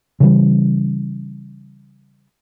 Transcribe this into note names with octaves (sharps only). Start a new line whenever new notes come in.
C#3 E3 G3